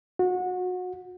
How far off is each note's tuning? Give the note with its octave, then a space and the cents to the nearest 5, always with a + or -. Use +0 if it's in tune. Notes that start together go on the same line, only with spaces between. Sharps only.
F#4 -25